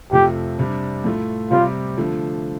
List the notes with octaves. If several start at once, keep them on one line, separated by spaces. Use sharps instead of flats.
F2 C3 F3 A3 G4
C3 G3 D4
A2 A3 F4
C3 G3 C4 F4 G4
D3 F3 A3